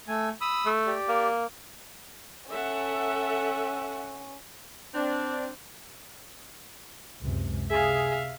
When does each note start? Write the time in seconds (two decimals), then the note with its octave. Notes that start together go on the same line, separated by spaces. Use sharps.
0.08 A3 G#5
0.41 B5 D#6 E6
0.66 A3
0.87 G4 D5
1.09 A#3
2.50 C#4 A4 E5 F#5
4.94 C4 D4
7.21 C#2 F#2 C3
7.70 C3 G#4 E5 F5